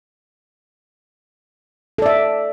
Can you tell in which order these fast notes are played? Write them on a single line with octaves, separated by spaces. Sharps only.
A4 D5 E5